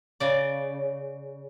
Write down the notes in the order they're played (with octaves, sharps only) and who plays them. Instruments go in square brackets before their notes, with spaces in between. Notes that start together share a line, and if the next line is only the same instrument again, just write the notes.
[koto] C#3 D5